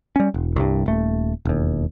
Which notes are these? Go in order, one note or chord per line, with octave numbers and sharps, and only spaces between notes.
G3 C#4
E1
C2 G2
D#1 A3
E1 D#2